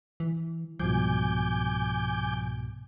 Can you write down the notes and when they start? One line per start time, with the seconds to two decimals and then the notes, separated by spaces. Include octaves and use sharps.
0.20 E3
0.79 C2 G#2 B2 F3 G#5 D6 G6